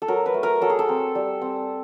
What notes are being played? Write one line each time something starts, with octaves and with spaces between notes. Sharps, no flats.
A4
F#3 A#4
B4
A3
A#4
F#3 A4
G#4
A4
C4
G3
C4